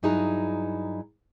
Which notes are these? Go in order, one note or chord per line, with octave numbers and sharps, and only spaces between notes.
G2 F#3 D#4 E4 G#4 A#5